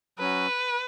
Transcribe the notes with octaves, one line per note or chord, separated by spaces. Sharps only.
F#3 C#4 F#4 B4